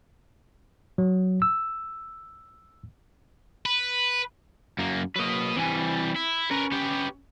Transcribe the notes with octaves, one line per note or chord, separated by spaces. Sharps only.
F#3
E6
B4
F#2 A#3
F#3 A#3 B4 D#5
E3 G3 C4 G#5
E4
C#4 A#4 B4
B3 G4